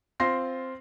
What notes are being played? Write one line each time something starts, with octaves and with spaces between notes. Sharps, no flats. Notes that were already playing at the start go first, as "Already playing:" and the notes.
C4 F4 C6 A#6 C7